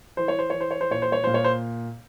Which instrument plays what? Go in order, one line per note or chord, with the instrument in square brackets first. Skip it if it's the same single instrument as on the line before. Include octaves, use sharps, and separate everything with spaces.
[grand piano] E3 C5
C#5
C5
E3 C#5
C5
C#5
C5
A#2 C#5
C5
C#5
A#2 C5
C#5
C5